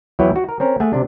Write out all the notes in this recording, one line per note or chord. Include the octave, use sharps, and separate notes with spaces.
E2 F#3 E4 B4 C#5 G5
F#4
A#4
C4 C#4 A#4
A3 G#4 F#5 G#5
C3 D4